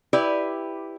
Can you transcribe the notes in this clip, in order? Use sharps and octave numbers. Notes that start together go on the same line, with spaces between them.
E4 G4 B4 D5